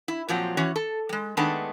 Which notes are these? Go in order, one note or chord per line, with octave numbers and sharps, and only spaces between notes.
E4
A#2 F3 F#3 C4
E3 C#4 F#4 C#5
A4
G3 G#3
D#3 G#3 A3 B3 D4 A5